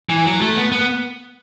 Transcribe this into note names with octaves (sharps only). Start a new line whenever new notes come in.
E3
F#3
A3
B3
B3